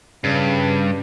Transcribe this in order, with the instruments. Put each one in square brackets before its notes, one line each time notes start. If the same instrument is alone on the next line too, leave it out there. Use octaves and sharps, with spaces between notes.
[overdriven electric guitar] G2 [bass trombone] C#3